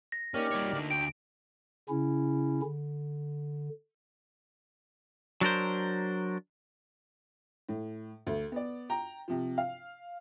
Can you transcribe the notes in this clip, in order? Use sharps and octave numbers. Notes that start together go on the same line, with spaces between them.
A#6
A#3 C#4 D#4 G4 D5 F6
G3 C#5
D2 D3
G5 D7
C#3 C#4 E4
D3
F#3 D4 A#4 C5
A2
D2
B3 D5
G5 A#5
C3 F3
F5